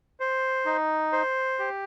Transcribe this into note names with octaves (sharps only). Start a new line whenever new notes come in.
C5
D#4
C5
G4